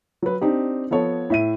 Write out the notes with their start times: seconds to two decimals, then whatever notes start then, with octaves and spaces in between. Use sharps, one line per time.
0.22 F#3 B4
0.41 C4 D4 D#4 G4
0.91 F3 B3 A4 C#5
1.30 A2 E5 D#7